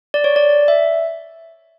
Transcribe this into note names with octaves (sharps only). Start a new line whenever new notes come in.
D5
C#5
D5
E5